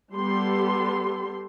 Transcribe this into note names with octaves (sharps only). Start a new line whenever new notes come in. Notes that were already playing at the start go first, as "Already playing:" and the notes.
G3 B3 G4 A4 C6